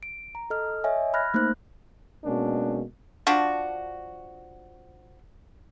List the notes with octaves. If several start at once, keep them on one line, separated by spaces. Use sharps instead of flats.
D7
A#5
A4 D#5 F6
C#5 D#5 E5 G#5
B5 F6 F#6 G#6 A#6
A3 A#3 D#4 C5 F#6
B2 G#3 A#3 C#4 D4
F3 D4 F#4